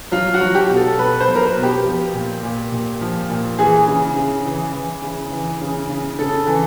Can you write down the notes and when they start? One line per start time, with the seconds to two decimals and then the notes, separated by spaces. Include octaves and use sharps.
0.12 F#3 F4
0.34 F#4
0.41 F#3
0.55 G4
0.69 B2
0.77 A4
0.99 B2 B4
1.20 C5
1.28 F#3
1.36 A#4
1.42 B4
1.57 B2
1.63 G4
1.85 F3
2.14 A#2
2.43 A#2
2.72 A#2
3.01 F3
3.30 A#2
3.59 E3 G#4
3.87 C#3
4.16 C#3
4.45 E3
4.74 E3
5.02 C#3
5.32 E3
5.61 C#3
5.89 C#3
6.19 C#3 A4
6.46 E3